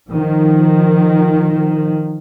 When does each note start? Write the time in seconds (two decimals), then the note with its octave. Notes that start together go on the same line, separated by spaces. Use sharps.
0.10 D#3 F3